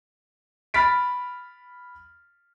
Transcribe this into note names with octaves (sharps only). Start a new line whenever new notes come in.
B5 F6 A6 B6 D7